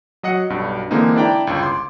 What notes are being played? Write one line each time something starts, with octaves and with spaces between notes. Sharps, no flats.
F#3 D#5 F#5 C#7
B1 G2 B2
D3 E3 G#3 A#3 C4 D#4
D4 E4 D5 G5 A#5 D6
G1 C#2
C6 D6